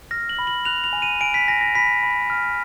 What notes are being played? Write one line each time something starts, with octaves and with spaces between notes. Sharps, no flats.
F6 A#6
F#7
B5
F#7
F#6 F7
F7
G#5
D#7
G#5 D7
B6
G#5 A#6
A#6
B5 B6
B5
F6